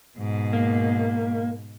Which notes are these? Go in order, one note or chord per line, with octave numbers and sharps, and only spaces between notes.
G#2 B2
A#3